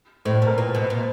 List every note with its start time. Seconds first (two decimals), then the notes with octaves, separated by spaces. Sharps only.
0.25 A2 C5
0.36 C5
0.42 B2 A#4
0.58 A#2 B4
0.69 C5
0.74 B2
0.90 A#2 C5